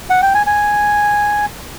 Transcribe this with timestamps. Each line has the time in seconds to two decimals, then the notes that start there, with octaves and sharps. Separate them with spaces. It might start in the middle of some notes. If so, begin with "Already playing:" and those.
0.10 F#5
0.22 G5
0.34 G#5
0.47 G#5